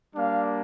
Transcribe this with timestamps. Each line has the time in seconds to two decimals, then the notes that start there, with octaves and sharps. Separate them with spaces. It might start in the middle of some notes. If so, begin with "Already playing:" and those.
0.15 G3 A#3 D4 F5